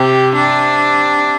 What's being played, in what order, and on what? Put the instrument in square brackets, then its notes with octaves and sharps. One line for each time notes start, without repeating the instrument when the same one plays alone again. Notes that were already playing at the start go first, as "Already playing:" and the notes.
Already playing: [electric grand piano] C3 [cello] G4
[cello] D4